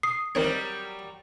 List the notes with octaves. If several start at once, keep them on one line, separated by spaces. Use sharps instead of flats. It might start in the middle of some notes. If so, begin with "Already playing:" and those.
D#6 C7
D#3 F#3 G3 C4 A#4 C#5